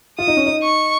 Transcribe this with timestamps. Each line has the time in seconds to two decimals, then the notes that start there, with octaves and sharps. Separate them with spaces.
0.18 F4 D#6
0.28 D#4
0.37 C#4
0.46 D#4
0.63 C#6